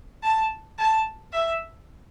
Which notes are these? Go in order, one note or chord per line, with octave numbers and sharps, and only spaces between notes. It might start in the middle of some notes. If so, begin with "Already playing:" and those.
A5
A5
E5